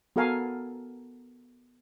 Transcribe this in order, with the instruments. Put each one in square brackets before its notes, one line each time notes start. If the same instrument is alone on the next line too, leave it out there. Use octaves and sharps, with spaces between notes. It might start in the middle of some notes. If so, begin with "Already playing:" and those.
[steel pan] B3 F#4 A4 A#4 F5 G#5